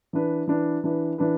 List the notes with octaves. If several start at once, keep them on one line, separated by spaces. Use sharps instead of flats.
E3 D4 B4
E3 D4 B4
E3 D4 B4
E3 D4 B4